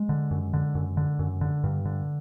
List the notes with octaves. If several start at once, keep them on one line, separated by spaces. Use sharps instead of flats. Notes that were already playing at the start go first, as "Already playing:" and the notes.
Already playing: G#3
D3
F#2
D3
F#2
D3
F#2
D3
G2
D3